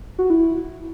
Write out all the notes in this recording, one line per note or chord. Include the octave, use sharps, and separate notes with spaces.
F#4
E4